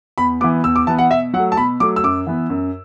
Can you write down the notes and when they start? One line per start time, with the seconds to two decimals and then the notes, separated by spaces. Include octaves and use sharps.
0.18 E2 B5
0.41 B3 D6
0.44 E3
0.64 E2 E6
0.76 D6
0.87 E3 B3 A5
0.99 F#5
1.11 B2 E5
1.33 F#3 F#5
1.38 A3
1.52 A5
1.57 B2 B5
1.80 F#3 A3 D6
1.96 E6
2.03 F#2 D6
2.27 E3 B3
2.50 F#2